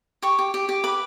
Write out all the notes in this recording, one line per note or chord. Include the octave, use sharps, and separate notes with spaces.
G4 C#6
G4
G4
G4
B4 D6